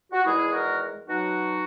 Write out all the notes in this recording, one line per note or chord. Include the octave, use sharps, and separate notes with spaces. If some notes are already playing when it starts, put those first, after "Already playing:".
F#4
E2 D#3 G#3 E4 G#4
F#4 A#4
B2 F#3 D#4 F#4